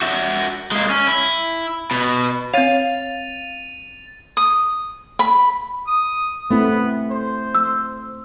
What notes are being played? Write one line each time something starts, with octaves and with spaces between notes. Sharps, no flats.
F#4 E5
G#3 A#3
C#4
E4
B2
C4 C#5 F5 A6 D#7 F7
D#6
B5
D#6
A3 B3 C4 E4
C5
E6